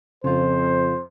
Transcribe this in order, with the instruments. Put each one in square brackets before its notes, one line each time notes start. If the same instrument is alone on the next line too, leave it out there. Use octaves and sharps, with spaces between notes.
[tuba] F2 [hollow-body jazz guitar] C#3 F4 [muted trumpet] C5